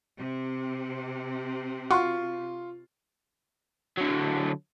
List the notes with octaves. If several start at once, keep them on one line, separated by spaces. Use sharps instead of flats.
C3
F4 F#4 C6 C#6
D3 F#3